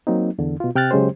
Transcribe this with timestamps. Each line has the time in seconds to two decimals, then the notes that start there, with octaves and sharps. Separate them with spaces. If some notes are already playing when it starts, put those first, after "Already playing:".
0.07 F#3 A#3 C4 D#4
0.39 E2 D3
0.60 B2 F4
0.75 C3 G5 F6 F#6 A6
0.91 C#3 F#3 G#3 C#4 G4 C5